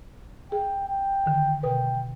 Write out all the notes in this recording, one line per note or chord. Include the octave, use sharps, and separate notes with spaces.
G#4 G5
G5
D3 D#3
B2 A#4 B4 G5